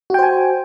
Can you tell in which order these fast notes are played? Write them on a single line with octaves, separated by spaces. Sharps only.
F#4 G5 C5 G#5